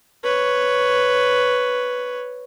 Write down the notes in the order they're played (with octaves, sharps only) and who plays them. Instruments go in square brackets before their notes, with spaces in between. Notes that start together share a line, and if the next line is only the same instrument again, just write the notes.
[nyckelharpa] B4 C#5